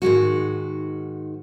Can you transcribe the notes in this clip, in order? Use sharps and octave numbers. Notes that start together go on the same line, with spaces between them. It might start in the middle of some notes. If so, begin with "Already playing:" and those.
G#2 D#3 G#3 F#4